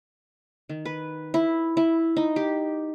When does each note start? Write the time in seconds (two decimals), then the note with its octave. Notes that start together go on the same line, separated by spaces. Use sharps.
0.69 D#3
0.85 B4
1.34 E4
1.77 E4
2.17 D#4
2.36 G4